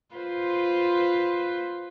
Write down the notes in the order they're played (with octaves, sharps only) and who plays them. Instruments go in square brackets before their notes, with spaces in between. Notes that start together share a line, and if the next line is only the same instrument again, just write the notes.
[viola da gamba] F4 B4 C5